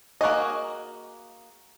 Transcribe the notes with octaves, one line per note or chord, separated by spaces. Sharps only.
A#3 F#4 G#4 D#5